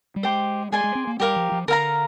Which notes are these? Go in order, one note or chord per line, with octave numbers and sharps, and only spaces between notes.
G3
G#3 G4 C5 G5
G#3 G#4 D5 G#5 C6
G#3
C4
A#3
G3 G4 A#4 F5
F3
F3
D3 A#4 F5 A#5